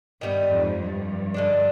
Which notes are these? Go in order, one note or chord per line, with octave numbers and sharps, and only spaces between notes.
G2 D#3 G3 B3
F2 G#2
G2
D3 G#3 D4